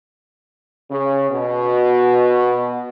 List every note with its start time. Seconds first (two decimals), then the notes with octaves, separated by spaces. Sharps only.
0.89 C#3
1.29 B2